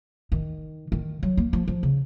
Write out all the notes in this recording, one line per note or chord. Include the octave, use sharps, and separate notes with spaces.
D#3
D#3
F#3
A#3
F3
F3
C#3